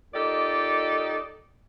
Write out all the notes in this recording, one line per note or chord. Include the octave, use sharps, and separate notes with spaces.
A#2 D#4 G4 A4 D5 D#5